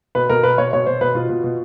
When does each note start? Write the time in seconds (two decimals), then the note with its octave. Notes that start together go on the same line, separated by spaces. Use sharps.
0.15 B2 B4
0.29 B2 A#4
0.43 B2 B4
0.58 B2 C#5
0.73 B2 C#5
0.87 B2 C5
1.01 B2 B4
1.15 B2 F4
1.30 B2
1.44 B2